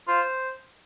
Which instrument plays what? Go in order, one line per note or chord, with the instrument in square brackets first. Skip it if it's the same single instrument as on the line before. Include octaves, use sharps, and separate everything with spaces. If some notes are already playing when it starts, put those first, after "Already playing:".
[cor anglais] F4 [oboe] C5